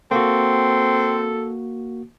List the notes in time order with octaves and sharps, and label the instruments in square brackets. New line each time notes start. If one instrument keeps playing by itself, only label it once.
[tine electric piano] A#3 F#4 [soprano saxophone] C4 [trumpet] A4